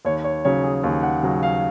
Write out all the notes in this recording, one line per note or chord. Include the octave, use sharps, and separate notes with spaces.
D#2 C#5
C#5
C#3 F#3 C#5
G#4
D#2
F#5
C#3 F#3
F5